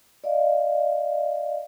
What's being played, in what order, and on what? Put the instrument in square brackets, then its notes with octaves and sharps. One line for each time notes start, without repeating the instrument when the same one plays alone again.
[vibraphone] D5 D#5 F5